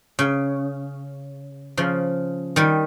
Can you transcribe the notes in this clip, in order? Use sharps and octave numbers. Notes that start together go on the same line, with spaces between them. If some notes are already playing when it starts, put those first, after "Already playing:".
C#3
C#3 F3
D#3 G3